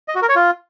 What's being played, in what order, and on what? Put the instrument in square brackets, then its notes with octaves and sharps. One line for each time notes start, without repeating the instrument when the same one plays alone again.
[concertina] D#5
F#4
A#4
C#5
F4